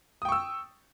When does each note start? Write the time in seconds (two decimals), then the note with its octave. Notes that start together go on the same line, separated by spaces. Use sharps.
0.22 D#6
0.25 G5
0.29 C#6
0.32 E6